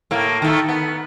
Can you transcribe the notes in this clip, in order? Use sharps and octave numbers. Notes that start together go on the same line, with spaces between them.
A2 A#3
D#3 A3
B3